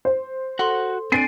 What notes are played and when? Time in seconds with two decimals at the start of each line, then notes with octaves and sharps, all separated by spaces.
0.05 C5
0.59 F#4 A4 F#5 C6
1.12 C4 D4 G#5 A6 C7 D7 D#7